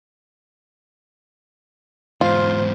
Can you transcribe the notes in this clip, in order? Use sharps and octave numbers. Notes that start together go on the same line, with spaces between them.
E2 G#2 F4 C5